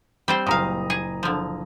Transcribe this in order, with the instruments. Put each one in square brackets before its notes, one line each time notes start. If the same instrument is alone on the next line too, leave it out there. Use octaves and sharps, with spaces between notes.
[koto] G3 C4 C5
[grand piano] F#1 A#5 D#6 [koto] A#2 F5
[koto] G#4
D3 F3